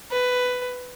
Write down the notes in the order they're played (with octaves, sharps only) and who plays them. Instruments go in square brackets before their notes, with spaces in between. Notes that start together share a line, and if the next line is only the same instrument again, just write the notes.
[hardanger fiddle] B4